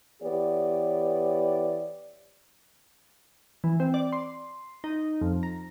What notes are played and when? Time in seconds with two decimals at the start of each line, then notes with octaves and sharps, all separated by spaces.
0.23 E3 B3 G4 C#5 D5
3.64 E3
3.80 C4
3.94 D5
4.13 C6
4.84 D#4
5.21 F2
5.43 A#5